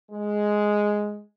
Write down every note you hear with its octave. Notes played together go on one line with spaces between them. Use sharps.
G#3